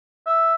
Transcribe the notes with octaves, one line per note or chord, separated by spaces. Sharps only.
E5